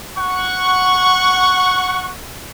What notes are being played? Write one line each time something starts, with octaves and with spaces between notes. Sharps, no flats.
F#5 C#6